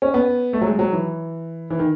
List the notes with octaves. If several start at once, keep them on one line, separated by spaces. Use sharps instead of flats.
C#4
B3
A3
F#3
G#3
F#3
E3
E3
D#3